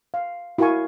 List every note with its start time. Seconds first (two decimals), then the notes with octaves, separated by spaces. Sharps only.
0.14 F5
0.58 E4 F#4 A#4 F5 G#5 C#6